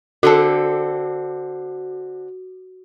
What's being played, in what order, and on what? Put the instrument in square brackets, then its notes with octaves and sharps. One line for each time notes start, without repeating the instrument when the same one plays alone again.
[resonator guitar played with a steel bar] D3 C4 A4 [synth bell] F#4